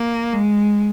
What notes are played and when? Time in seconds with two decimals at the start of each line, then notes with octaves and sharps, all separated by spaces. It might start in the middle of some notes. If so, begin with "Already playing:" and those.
Already playing: A#3
0.33 G#3